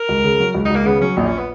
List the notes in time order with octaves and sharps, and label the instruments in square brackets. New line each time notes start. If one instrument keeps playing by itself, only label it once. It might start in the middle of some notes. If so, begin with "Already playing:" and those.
Already playing: [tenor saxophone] A#4
[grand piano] C#2
C#3
F#3
C#2
[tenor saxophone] D#4
[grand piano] C#2
[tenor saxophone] A#3
[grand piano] C#3 [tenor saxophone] B3
[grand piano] F#3 [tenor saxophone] C#4
[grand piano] A#1 [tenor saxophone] D#4
[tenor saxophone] C#4
B3